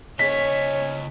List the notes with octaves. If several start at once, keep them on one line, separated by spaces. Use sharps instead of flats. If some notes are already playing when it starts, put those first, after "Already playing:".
C#3 C#4 C5 C#5 D#5 B6